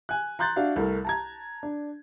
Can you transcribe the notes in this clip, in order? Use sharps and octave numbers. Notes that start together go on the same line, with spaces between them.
G#5 F#6
A#5 C6 F#6 G6 A6
D4 F#4 E5 F5
C2 A3 A#4
A5 A#5 G#6
D4